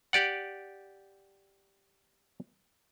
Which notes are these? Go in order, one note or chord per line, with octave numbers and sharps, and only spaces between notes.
G4 D5 F#5